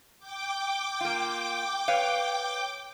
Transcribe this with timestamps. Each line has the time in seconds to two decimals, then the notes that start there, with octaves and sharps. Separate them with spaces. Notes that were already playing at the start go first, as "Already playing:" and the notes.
0.19 G5 D6
1.01 A#3 F4
1.88 B4 C#5 F5